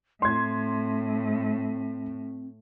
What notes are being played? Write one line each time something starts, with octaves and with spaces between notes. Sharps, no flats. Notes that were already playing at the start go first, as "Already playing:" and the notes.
A2 C4 C6 G#6